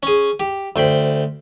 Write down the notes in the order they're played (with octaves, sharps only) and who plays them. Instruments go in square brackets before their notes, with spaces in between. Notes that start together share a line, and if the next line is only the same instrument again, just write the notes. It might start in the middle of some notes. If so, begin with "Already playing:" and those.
[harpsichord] C#4 G#4
G4
D2 C5 G5 B5